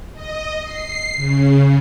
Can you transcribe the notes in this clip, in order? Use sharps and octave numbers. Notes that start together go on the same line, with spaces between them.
D#5
C7
C#3